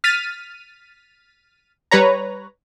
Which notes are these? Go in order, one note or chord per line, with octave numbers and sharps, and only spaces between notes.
F6 A6 B6 D#7
G3 B4 C#5 A#5